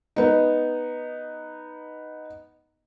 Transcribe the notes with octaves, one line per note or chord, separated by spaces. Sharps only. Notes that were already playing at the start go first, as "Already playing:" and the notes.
B3 D#4